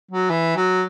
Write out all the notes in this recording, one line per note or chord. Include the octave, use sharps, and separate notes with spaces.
F#3
E3
F#3